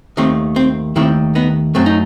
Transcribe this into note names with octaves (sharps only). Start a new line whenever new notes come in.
D#2 D#3 A3 C4
C4
D#2 D#3 A3 C4 E4
B3 D#4
F#2 F#3 A3 C4
D#4